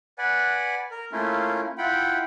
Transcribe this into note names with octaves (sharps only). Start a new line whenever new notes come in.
B4 D5 F#5 G#5
A#4
A3 A#3 C#4 E4 F4
E4 F4 F#5 G5 B5